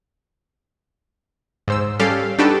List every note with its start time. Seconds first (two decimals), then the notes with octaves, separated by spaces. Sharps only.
1.68 G#2 C5 E6
2.00 G3 C#4 G4 A4 F5
2.39 D4 D#4 F#4 G4 A4 B4